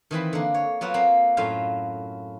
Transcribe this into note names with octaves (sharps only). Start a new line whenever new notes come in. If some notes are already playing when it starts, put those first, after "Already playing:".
D#3 E3 C4 B5
D3 A#3
C#5
F#3 B3 F4 F#4
A#3 C4
F#2 A2 F4 C5 F5